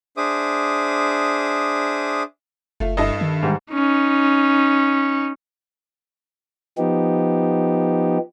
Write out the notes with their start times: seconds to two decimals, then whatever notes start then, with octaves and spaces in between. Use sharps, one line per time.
0.17 D4 G#4 C5 E5 D6 D#6
2.80 F#1 A3 F4
2.97 G2 E4 A4 D#5
3.21 D#3
3.43 G#2 G3
3.73 C#4 D#4
6.78 F3 B3 D#4 G4